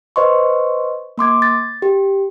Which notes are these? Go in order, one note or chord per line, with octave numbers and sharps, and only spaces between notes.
B4 C5 D#5 C6 C#6
A#3 C6 D6 G#6
A6
G4